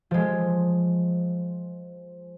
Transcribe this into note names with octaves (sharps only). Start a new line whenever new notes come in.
F3 G#3